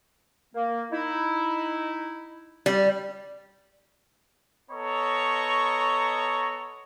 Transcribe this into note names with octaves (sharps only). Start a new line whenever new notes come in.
A#3
D#4 E4
G3
B3 A4 C#5 D#5 A#5 C#6